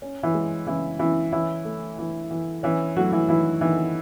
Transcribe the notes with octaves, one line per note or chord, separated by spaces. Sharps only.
C#4
E3 E4
G#3
C#3 E3 E4
C#3 E3 E4
E3 C#4 E4
A3
E3
E3
E3 C#4 E4
F#3 A3 F#4
E3 E4
D#3 E3 E4
D#3 E3 E4